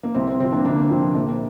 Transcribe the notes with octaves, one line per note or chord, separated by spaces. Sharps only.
A#3
C2 C4
C4
C3 F3 C4
A#3 D4
D2 A#3 D4
C3 F3 C4
A#1 A#3